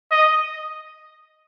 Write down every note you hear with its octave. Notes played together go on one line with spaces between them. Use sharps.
D#5